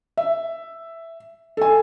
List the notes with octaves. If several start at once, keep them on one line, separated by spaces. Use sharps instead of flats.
E5
A4 G#5